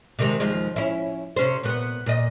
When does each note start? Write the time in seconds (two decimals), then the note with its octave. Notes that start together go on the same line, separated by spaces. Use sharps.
0.19 C3 D#3 G#3
0.40 D#2 F3 G#3
0.76 C#4 E4
1.36 C3 C#4 C5
1.63 A#2 B3
2.06 A#2 D#5